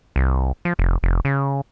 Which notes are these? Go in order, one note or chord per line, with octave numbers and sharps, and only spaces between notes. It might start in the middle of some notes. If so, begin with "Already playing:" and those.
C2
F3
F1
F1
C#3